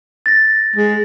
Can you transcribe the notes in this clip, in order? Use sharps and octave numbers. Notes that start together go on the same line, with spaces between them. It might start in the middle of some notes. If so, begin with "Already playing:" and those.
A6 A#6
G#3